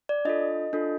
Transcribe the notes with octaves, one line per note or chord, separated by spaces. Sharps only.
D5
D4 F4 A4 D#5
D4 F4 A4